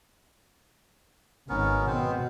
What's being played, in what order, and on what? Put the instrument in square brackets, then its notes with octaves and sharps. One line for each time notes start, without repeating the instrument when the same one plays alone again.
[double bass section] G#1 [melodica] B3 C#4 A#4
[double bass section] B2 [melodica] B3 C4 C5